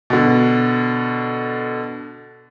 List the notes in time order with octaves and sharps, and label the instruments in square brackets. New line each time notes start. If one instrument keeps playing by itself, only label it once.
[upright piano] B2 D3